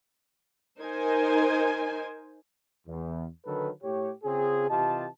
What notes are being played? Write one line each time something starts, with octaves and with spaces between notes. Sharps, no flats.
D#4 A#4 C5 G#5
E2
D3 D#3 F#3 A4 B4
A2 G4 C#5
C#3 C4 C#4 F4 G#4
C3 E3 F4 G4 D#5 A5